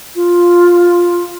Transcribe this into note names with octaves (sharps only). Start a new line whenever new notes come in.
F4